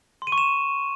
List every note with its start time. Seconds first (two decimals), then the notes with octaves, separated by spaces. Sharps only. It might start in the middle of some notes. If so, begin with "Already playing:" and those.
0.22 C6
0.27 D#7
0.32 C#6
0.38 E7